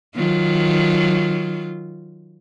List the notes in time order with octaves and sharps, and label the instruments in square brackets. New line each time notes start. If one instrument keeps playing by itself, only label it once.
[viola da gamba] D#3 F#3 F4